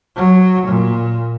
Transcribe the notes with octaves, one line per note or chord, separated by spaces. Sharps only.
F#3
A#2